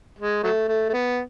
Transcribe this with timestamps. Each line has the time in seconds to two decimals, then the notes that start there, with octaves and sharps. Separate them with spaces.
0.19 G#3
0.43 F#3 A3
0.68 A3
0.89 A3
0.93 B3